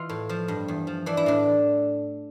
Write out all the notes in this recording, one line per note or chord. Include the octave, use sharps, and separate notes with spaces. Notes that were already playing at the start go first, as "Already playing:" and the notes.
Already playing: E3 F4
A2
F3
G2
E2
F3
E3 D4
E4
A2 D4